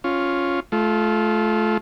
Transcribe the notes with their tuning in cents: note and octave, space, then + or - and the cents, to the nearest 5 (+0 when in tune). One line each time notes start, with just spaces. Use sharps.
C#4 +0 F4 +5
A3 -25 F4 +0